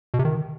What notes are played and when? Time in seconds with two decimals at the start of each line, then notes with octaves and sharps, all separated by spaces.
0.14 B2
0.19 C3
0.25 D#3